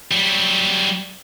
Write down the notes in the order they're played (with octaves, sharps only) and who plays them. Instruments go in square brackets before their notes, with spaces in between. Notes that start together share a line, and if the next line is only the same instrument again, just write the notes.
[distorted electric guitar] F#3 G3